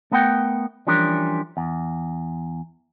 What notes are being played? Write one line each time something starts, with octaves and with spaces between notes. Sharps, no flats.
A3 B3 A#4 F#5 G5
E3 F3 G3 C#4 D4 A#4
E2